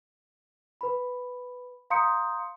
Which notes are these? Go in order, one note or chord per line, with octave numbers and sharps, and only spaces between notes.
B4 B5
F5 A#5 C6 D#6 G6 C#7